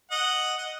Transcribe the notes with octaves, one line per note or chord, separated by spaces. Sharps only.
D#5 F#5
D#5 F#5